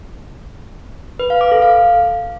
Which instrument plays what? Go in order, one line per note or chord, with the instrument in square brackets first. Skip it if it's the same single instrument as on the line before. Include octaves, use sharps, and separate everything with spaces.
[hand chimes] B4
F5
D6
A4
F5